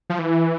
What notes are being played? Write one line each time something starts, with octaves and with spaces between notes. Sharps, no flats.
F3
E3